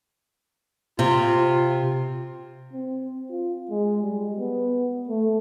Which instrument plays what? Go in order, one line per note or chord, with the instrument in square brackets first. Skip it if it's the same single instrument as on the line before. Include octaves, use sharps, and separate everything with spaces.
[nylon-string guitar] C3 [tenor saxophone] F4
[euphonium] C4
F4
G#3
G3
B3
A3